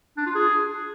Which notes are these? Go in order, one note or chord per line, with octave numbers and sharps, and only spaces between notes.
D4
F4
G#4